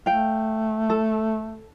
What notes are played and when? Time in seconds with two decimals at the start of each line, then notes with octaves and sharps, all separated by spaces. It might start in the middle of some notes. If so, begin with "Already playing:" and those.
0.06 A3 F5 G5
0.90 A4